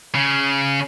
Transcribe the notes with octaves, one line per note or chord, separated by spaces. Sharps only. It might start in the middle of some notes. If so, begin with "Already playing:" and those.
C#3